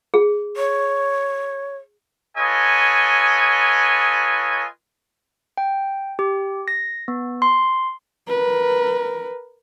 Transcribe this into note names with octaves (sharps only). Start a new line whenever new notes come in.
G#4
C#5
F4 A4 B4 C#5 D#5 G#5
G5
G4
A#6
B3
C6
A#4 B4